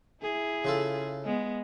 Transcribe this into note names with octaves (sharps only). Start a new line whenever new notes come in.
E4 G#4
C#3 F4 A4
G#3 B3